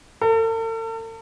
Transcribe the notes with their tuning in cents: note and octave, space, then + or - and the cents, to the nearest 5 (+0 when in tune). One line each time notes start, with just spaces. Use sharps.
A4 +45